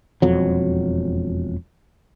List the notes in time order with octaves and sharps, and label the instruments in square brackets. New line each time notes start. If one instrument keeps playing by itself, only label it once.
[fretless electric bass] E1 F2 F#3